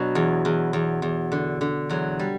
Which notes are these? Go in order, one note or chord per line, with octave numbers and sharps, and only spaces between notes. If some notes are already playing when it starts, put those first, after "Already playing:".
Already playing: B2 F#3 D4
E2
E2
E2
E2
D3
D3
E2 F#3
G3